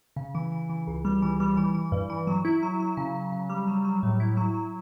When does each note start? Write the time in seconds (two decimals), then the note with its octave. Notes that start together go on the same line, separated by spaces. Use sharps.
0.16 C#3
0.35 E3
0.52 E3
0.70 E3
0.87 C#2
1.05 G3
1.22 E3
1.40 G3
1.57 E3
1.75 E3
1.92 G2
2.10 E3
2.27 F#3
2.45 E4
2.63 F#3
2.80 F#3
2.97 C#3
3.15 C#3
3.32 C#3
3.50 G3
3.67 F#3
3.85 F#3
4.03 A2
4.20 E4
4.37 F#3
4.54 F#3